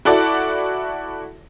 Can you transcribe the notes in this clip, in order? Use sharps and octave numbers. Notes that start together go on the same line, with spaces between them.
E4 F#4 A4 D5